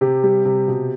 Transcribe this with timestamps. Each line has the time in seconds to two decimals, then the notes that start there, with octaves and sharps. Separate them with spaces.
0.01 C3 G4
0.23 G3
0.45 C3
0.68 B2